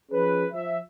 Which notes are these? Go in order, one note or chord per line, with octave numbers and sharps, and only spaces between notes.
F3 C#4 G#4 B4
F3 E5